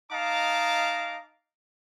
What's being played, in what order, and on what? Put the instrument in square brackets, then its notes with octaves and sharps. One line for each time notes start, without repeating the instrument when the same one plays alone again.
[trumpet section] D#4 D#5 F5 A5 A#5 D6